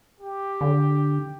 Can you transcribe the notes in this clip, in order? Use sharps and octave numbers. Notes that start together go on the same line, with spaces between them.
G4
D3